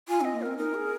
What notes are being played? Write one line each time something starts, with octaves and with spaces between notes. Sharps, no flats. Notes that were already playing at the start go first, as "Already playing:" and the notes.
F4 G#5
C4 D#5
A#3
C4 A#4
D#4 A#4
G#4